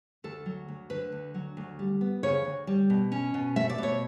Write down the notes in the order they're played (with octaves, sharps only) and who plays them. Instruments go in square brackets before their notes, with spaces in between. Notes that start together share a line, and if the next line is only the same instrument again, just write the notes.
[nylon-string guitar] D2 A4
F#3
D2
D3 B4
D2
F#3
D2
G3
B3
C#3 C#5
D2
G3
B2
C#4
B2
A3 E5
D5
B2 C#5